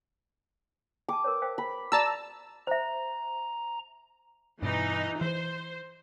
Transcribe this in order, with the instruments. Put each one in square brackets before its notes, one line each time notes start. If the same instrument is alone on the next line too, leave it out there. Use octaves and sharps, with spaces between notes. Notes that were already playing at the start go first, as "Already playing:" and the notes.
[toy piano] G5 A5 [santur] D6
[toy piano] A#4 B4 C#5
C5 F5 G5
[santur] B5
[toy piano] F#4 D5 D6 [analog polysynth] A5 E6 [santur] A#5
[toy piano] C5 E5 [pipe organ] A#5
[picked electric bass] G2 B2 [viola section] E3 D#4
[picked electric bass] E3 [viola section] C5